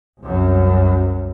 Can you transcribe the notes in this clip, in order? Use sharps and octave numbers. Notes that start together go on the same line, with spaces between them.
C2 F#2